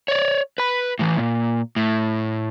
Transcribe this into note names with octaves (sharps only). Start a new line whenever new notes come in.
C#5 D5
B4 B5
A2 E3
A#2
A2